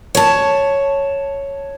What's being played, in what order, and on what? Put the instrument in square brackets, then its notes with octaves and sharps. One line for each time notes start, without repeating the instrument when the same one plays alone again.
[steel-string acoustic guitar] C#5 A5